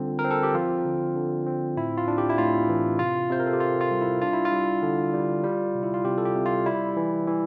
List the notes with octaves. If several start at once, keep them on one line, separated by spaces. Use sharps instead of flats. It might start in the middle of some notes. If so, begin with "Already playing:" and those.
Already playing: D3 G3 C4 F4
A#4
C4
A4
G4
F3 F4
D3
D3
C4
A2 E4
F4
D4
G4
E4
A2 F4
E3
C3 F4
C3 C5
A#4
A4
G4
C3 F4
F4
G3
E4
D4 F4
E4
F4
G3
D3
G3
G3
C3
E4
F4
C3 G4
A4
G4
C3
F4
G3 E4
E3
E3